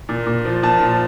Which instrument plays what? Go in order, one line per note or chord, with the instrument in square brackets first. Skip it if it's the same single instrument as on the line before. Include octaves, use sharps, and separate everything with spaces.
[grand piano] A#2
A#2
F3
A#2 A5
F3